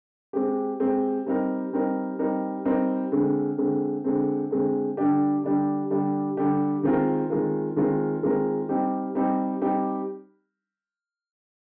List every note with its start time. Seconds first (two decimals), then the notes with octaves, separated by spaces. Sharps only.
0.33 G#3 C4 G4
0.80 G#3 C4 G4
1.26 G3 C4 D#4 A#4
1.73 G3 C4 D#4 A#4
2.19 G3 C4 D#4 A#4
2.65 G3 C4 D#4 A#4
3.12 D3 G#3 C4
3.58 D3 G#3 C4
4.04 D3 G#3 C4
4.51 D3 G#3 C4
4.97 D3 G3 D4 G4
5.44 D3 G3 D4 G4
5.91 D3 G3 D4 G4
6.37 D3 G3 D4 G4
6.83 D#3 G#3 C4 F4 A#4
7.30 D#3 G#3 C4 F4 A#4
7.76 D#3 G#3 C4 F4 A#4
8.22 D#3 G#3 C4 F4 A#4
8.69 G3 C4 D#4 G4
9.15 G3 C4 D#4 G4
9.61 G3 C4 D#4 G4